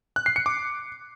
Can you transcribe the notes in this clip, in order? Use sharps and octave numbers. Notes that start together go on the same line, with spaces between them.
F#6
C7
C#7
D6